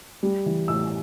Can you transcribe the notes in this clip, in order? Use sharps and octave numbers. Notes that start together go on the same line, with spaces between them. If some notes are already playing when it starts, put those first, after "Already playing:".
G3
E3
A2 E6